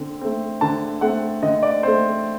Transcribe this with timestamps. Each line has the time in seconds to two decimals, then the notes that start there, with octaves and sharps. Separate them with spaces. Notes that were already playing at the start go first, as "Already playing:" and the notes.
Already playing: D3 C4
0.21 A3 C4
0.61 D3 A5
1.01 A3 C4 F#5
1.43 D3 D#5
1.63 D5
1.83 A3 C4 C5